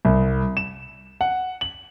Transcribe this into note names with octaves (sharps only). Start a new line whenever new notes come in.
C2
E7
F#5
F#7